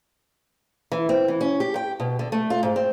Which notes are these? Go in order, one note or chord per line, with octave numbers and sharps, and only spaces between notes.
E3
C4
E3
C#4
G4
G5
B2
D3
A3
F4
G#2
C4